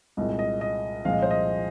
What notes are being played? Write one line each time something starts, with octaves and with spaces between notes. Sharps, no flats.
C2 A#2 G#3 D#5
D#5
D#5
C2 A#2 F3 G#3 F5
D#5
C5
D#5